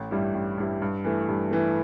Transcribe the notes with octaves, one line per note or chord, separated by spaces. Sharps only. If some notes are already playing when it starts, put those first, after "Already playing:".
Already playing: A1
G2 G3 E4
A1
G2 G3 E4
G2
E3 A3
G2
E3 A3